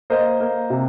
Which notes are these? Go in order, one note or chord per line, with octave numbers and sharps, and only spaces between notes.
A#3 C5 D#5
A#3
C3